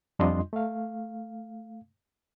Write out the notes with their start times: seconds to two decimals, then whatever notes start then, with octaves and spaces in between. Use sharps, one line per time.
0.19 F2 G3 D4 F4 D#5 C6
0.53 A3 F5